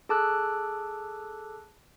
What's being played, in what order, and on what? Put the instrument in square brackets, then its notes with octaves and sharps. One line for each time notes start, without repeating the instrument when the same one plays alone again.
[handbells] G#4 A4 A5 D6 E6 F#6